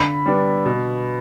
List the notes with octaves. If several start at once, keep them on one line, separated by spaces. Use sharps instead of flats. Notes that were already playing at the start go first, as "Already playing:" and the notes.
Already playing: D3 B5
G3 B3 D4
B2